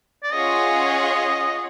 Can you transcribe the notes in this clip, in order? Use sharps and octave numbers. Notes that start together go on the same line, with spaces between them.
D5
C#4 F4 G#4 C#5 D#5 F#5